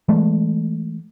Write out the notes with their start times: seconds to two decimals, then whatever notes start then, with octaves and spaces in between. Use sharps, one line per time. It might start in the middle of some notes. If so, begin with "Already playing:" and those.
0.08 E3 G#3 A3